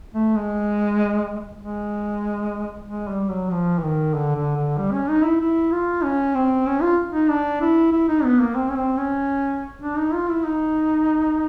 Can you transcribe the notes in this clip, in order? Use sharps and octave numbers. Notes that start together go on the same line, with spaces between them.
A3
G#3
G#3
G#3
G3
F#3
F3
E3
D#3
D3
D3
D3
G3
C#4
D#4
E4
E4
F4
C#4
C4
C#4
F4
D#4
D4
E4
E4
D#4
B3
A#3
C4
C#4
C4
C#4
D4
D#4
F4
E4
D#4